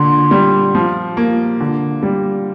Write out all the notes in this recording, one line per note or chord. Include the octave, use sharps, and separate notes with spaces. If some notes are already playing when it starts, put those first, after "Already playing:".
Already playing: A#2 D3 C6
G3
F3
A#3
D3
G3